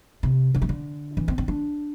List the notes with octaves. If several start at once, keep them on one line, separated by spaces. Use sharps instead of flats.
C3
D3
E3
D3
E3
C4
C4
D4